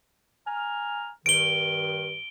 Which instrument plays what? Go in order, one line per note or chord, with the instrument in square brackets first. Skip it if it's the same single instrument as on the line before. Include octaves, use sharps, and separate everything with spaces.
[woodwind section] G#5 A#5 F6
[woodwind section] G2 D#3 [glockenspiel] D7 G7